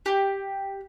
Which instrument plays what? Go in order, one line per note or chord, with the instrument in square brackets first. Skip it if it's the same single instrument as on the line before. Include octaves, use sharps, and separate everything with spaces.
[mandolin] G4